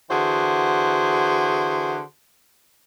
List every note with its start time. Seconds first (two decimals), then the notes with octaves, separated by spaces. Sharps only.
0.10 D3 E3 F#4 G#4 C5